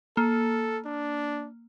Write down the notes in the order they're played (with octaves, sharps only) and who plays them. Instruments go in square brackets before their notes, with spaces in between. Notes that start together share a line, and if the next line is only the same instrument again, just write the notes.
[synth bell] A#3 [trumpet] A4
[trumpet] D4